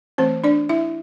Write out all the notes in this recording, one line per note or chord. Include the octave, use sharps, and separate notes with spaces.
E3 A3 C4 C5
D4 D5
E4 E5